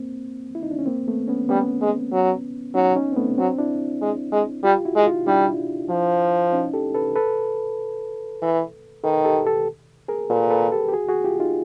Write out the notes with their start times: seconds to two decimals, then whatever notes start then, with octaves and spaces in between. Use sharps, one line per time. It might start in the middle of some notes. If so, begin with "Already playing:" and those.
Already playing: A#3 C4
0.55 E4
0.63 D#4
0.71 D4
0.79 C#4
0.86 A#3 C4
1.08 A3 B3
1.28 B3 C#4
1.49 G3 B3 C#4
1.81 G#3
2.12 F#3
2.75 F#3 C#4 D#4
2.96 C#4 D#4
3.12 C4
3.17 A3 B3
3.38 F#3 C4 D4
3.58 D4 E4
4.02 G#3
4.32 G#3
4.63 G3 F4 G4
4.85 E4 F#4
4.96 G#3
5.06 D#4 F4
5.27 G3 D4 E4
5.90 F3
6.52 C#4 D#4
6.74 G4 A4
6.94 A4 B4
7.16 A4 B4
8.42 E3
9.04 D#3 A4 B4
9.25 G4 A4
9.46 G4 A4
10.08 G#4 A#4
10.30 A#2 A4 B4
10.50 A4 B4
10.72 G4 A4
10.88 G4
10.92 F#4 G#4
11.08 F#4 G#4
11.24 F4 G4
11.39 D#4 F4